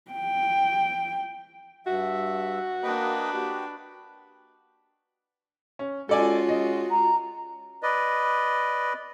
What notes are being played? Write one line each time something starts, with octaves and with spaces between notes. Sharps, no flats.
G5
G2 F#4 E5
A#3 D4 B4 D#5 G5
F#4 G4
C#4
G#3 C#4 F4 F#4 A4 D5 G#5
D#5
A#5
B4 D5 D#5